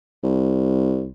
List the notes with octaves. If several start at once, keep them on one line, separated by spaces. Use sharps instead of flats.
C2